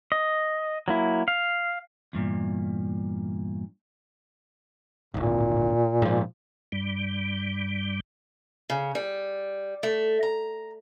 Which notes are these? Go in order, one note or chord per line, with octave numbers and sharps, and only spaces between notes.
D#5
F#3 A#3 E4
F5
E2 G2 A#2
D1 G#1 A#2
G#2 F3
G2 G3
C#3
G3
A3
A#5